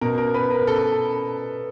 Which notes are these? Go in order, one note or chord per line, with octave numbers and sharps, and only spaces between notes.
B2 A#4
A#4
B4
A#4
A4